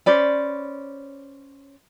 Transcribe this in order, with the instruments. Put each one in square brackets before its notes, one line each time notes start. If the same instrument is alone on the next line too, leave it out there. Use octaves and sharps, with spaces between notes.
[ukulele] C#4 C5 D5 B5